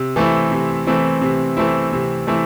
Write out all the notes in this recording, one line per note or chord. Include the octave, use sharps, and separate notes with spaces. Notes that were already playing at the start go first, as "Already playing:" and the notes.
Already playing: C3
E3 A3 C4 E4
C3
E3 A3 C4 E4
C3
E3 A3 C4 E4
C3
E3 A3 C4 E4